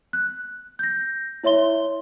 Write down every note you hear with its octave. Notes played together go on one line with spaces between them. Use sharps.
F#6
G6 A#6
E4 C#5 E5 C6 G7